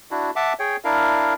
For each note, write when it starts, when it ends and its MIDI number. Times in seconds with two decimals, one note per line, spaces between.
0.11 0.31 62
0.11 0.31 64
0.11 0.31 66
0.36 0.53 76
0.36 0.53 78
0.36 0.53 81
0.36 0.53 86
0.59 0.77 68
0.59 0.77 73
0.59 0.77 79
0.85 1.34 62
0.85 1.34 64
0.85 1.34 70
0.85 1.34 77